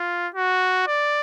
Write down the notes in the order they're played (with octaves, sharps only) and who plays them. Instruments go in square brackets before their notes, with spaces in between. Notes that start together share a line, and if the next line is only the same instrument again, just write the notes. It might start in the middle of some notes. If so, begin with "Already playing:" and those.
Already playing: [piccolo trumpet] F4
F#4
D5